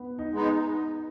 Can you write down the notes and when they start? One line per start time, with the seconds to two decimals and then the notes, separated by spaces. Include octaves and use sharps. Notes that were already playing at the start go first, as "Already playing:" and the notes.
Already playing: B3
0.19 D#4
0.33 G#3 B3 D#4